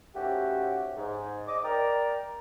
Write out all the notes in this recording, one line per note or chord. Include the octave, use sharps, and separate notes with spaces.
G#2 A3 C#4 F#4 G4
G#2
D#5 D6
A#4 D5 G5 A#5